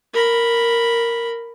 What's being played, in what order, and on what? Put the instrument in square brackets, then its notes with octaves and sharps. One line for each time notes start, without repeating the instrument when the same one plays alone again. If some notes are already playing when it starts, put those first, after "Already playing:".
[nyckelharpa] A#4 B5